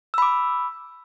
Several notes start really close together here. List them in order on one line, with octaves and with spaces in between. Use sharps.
E6 B5 D6